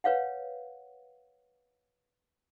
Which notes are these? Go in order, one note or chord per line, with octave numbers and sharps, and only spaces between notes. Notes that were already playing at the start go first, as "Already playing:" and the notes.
B4 C#5 F5 F#5